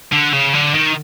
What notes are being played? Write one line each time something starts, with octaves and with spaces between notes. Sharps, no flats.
D3
C#3
D3
D#3